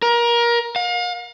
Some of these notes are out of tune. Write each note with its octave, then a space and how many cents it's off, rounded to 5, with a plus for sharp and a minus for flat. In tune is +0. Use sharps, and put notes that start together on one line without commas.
A#4 +25
F5 +40